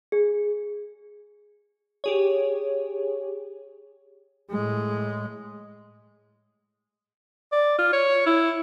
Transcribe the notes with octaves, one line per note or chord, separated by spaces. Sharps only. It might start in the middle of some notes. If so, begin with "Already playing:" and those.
G#4
G4 G#4 C#5
A2 G#3
D5
F4
C#5
E4